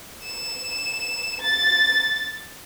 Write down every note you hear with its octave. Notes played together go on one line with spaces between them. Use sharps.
E7
A6